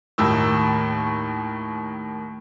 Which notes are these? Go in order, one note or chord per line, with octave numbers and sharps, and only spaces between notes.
D#2 A2 D#3 E6